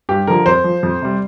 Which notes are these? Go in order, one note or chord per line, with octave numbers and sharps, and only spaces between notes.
G2 G4
D3 F3 A#4
F2 C5
F3
F2
C3 G3